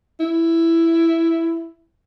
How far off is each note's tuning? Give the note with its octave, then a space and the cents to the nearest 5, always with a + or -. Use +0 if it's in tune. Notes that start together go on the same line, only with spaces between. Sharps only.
E4 +5